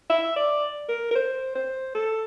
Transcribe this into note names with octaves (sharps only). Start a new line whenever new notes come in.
E5
D5
A#4
A#4
C5
C5
A4